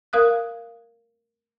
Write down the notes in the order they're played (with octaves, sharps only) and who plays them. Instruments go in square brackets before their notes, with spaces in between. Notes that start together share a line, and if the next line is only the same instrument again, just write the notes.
[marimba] A#4 F5 D#6 F#6